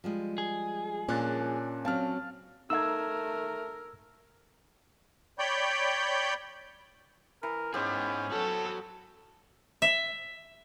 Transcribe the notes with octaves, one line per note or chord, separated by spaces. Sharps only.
F3 G3 G#3
G#4
A#2 C#4 D4 A#4 F#6 A6
F#3 C4 F5 A5 F6
A3 D#4 A#4 F5 E6 G#6
C#5 D5 G5 B5 G6
E3 A#4
G#2 B3 C#4 D#4 G4 G#4 C5
F#3 F#4 A4
E5